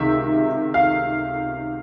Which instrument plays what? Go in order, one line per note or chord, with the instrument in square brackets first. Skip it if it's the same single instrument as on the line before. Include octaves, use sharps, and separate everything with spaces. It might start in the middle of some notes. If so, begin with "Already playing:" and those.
Already playing: [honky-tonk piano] C#2 C3 D#3 E5
F5